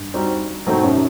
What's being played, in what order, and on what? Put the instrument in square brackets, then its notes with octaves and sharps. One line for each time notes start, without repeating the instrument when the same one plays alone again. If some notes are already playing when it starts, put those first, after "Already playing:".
Already playing: [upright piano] G2
[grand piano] G3 C4 D#4 F#4
[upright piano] G#2 [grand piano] B2 F#3 A3 C4 D#4
[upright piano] F#2